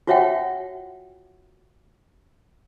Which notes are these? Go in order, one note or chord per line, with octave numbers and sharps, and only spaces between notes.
F4 F#4 C#5 E5 F#5 G5